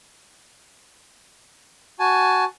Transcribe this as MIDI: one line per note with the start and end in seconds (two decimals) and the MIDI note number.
2.00 2.44 66
2.00 2.44 80
2.00 2.44 81